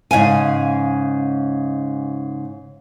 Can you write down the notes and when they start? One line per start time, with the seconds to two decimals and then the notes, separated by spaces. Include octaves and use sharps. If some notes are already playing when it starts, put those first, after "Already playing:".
0.11 G#2 C#3 F5 G#5